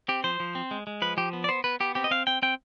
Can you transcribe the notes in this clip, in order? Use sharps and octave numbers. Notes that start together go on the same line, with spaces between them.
C4 G4
F3 C5
F3
C4
G#3
G#3
F3 B4
F3 G4
B3
D5
B3 C5
B3 B4
B3 G4
C4 G4
D#5
C4 F5
C4 G5
C4 G5